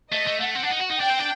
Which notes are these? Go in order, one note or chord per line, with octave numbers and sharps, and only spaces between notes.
A3 D#5
A3
A3 F#5
C4
D4
D#4
F#4
D#4
D4 G5
C4
D4